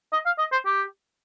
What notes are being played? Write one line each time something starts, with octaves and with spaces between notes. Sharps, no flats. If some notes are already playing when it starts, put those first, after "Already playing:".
D#5
F5
D#5
C5
G4